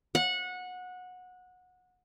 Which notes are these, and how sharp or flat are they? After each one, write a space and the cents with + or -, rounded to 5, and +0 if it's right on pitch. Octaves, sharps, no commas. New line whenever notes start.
F#5 -20